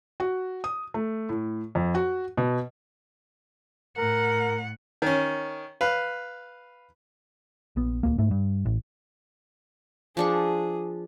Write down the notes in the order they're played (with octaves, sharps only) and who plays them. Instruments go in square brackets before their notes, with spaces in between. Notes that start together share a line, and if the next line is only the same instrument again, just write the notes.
[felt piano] F#4
D#6
A3
A2
F2
F#4
B2
[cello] A2 F#5 [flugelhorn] A#4
[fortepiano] D#3 C#4
B4 F5
[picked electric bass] A#1 B3
D1 C#2 A#3
G#2 A3
G2
A1
[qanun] F3 D4 C#6 [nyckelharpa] G#4